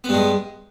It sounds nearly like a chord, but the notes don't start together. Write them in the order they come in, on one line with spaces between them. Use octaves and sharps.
B3 G2 G#3